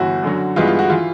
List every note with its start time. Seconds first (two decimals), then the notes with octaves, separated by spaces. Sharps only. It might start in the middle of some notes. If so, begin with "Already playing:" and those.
Already playing: G1 E3 F#4
0.23 F#2 D3 F#3
0.56 G2 E3 G#3 B3 F4
0.67 F4
0.79 F#4
0.90 E3 F4